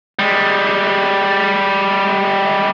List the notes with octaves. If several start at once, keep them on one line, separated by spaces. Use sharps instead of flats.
G3 G#3